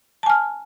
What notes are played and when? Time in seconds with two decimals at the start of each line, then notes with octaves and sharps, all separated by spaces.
0.23 A5
0.26 G#5
0.30 F6